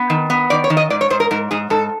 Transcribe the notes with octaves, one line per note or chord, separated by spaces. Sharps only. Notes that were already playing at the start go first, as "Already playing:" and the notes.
Already playing: B3
D#3
B3
D#3 D5
C#5
D#3
D#5
G#2 D5
C#5
G#2 C5
A#4
G#2 A#4
G#2 G#4
G#2 A4